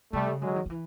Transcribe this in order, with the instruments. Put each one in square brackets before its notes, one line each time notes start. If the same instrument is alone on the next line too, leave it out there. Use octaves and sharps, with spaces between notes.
[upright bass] C3 [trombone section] G3 A3
[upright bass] C#3
[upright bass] D3 [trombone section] F#3 G#3
[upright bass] D#3
D#3
E3